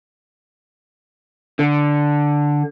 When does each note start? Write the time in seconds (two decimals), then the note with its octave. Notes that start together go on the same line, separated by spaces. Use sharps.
1.59 D3